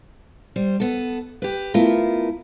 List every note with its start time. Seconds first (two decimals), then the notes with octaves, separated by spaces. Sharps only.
0.56 G3 C5
0.80 B3 A4
1.42 G4 B4
1.74 A3 B3 E4 F4 A#4